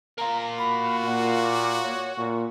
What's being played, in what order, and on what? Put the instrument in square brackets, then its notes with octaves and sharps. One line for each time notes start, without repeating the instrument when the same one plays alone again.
[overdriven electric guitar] A#3 F4 [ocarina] A#5
[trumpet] F#4 [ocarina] B5
[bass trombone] A#2 [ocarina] F#5
[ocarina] D6
C#5
[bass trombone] A#2 [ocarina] C#6